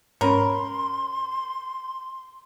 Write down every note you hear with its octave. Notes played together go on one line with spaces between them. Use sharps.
G#2 C#4 A#4 C#5 B5 C6